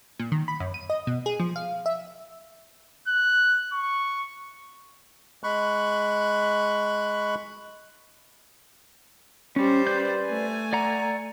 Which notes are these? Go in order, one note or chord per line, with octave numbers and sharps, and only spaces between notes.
A#2
D#3
B5
F#2
D#7
D#5
B2
G#4
F3
F5
E5
F#6
C#6
G#3 B5 C#6 F#6
G3 C#4 C5
B4 D5 G6
A3 G#5
D5 F#5 A#5